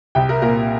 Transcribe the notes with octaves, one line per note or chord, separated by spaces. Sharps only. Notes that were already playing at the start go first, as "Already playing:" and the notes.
C2 G5
A#4
A#2 A#4